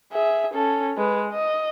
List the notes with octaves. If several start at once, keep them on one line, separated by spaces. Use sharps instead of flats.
G#4 E5
C#4 A4
G#3 B4
D#5